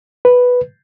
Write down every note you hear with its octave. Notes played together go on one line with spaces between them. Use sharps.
B4